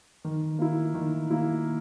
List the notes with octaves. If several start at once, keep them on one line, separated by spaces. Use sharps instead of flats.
D#3
A#3 E4
D#3
A#3 E4